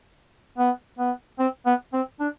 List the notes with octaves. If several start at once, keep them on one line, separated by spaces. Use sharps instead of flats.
B3
B3
C4
B3
C4
D4